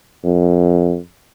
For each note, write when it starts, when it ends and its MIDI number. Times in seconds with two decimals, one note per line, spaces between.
0.24 0.97 41